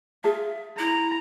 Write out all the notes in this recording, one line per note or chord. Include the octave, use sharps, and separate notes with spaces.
F4 G#4 E5 A5
E4 A#5